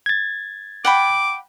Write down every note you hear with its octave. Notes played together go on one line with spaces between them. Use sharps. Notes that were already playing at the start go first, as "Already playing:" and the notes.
G#6 A6
F#5 G5 B5 D6